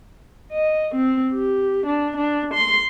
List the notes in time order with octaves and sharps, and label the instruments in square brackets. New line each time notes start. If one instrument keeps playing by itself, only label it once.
[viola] D#5
C4
G4
D4
D4
C6